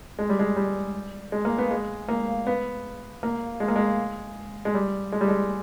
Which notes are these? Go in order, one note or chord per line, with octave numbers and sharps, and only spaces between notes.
G#3
G3
G#3
G3
G#3
A#3
B3
G#3
A#3
B3
A#3
G#3
A#3
G#3
G#3
G3
G#3
G3
G#3